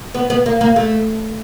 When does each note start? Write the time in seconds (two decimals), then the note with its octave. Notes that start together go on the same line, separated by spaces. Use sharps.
0.15 B3
0.30 B3
0.46 A#3
0.61 A#3
0.76 A3